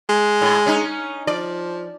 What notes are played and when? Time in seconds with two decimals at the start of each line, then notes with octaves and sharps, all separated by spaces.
0.09 G#3
0.42 A2
0.66 C#4 D#4
1.27 F3 D5